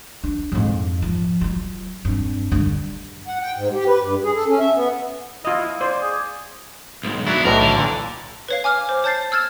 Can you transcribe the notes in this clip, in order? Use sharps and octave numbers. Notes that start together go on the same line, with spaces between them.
D4
F2 G#2
F3
F#3 F4
G2 C4
G2 D3
F#5
G5
G#2
G4
B4
G2
G#4
A4
C#4
E5
B3
E4 F4 D#5
C5 D5
G#4
B1 G#2
B2 F#3 D4 E4
B1 A2 E3 A#4
D3
A#2 E3
B4 C#5 F5
G#5 D6 F6
C5
C#5 A5 G6 A6 C7
E6 F6 G#6 A6 E7